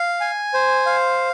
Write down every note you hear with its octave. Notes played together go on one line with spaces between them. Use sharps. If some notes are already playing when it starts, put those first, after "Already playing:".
Already playing: F5
G#5
C5
F5